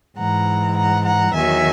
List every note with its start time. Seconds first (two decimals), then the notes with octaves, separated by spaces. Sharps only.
0.17 G#2 E3 F#5 A#5
0.75 F#5 A#5
1.05 F#5 A#5
1.33 E2 D#3 F#3 E5 G#5